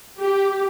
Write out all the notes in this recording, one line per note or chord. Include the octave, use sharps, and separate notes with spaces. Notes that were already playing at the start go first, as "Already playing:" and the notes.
G4